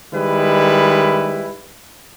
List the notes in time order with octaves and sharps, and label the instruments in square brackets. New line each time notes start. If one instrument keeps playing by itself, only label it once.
[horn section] D#3 G3 G#3 E4 B4